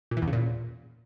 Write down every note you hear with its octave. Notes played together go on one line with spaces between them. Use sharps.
A#2
E3
E2
C#3
A#2